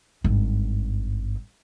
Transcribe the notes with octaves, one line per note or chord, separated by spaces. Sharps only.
G#1 G2